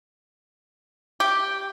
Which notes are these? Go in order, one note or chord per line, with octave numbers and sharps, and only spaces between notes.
G4